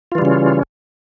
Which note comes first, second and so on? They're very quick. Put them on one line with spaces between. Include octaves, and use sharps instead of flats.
F4 E3 G3 C#3 C#4